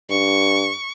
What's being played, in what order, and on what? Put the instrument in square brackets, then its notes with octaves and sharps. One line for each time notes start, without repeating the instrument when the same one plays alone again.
[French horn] G2 [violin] C#6